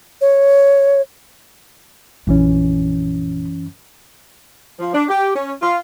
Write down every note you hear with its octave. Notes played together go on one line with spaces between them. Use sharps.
C#5
A#1 F#2 E3 C#4
F3
D4
G4
C#4
F4